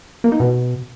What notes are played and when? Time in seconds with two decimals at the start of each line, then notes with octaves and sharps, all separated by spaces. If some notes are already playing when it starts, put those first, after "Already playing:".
0.24 A#3
0.32 D#4
0.40 B2